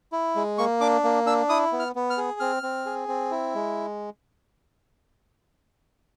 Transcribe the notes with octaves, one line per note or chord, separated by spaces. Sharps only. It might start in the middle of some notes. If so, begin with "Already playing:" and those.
E4
G#3
A#3 C#6
D4 D6
A#3
D4 E6
E4 D#6
B3
F6
B3
F6
G#4
C4 F6
C4
G#4
C4
E4
G#3